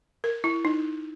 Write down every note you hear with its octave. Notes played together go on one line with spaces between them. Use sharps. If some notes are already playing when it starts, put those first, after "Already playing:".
A#4
E4
D#4